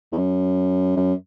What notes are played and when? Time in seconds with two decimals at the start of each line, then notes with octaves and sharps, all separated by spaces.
0.12 E2
0.17 F#2
0.97 F#2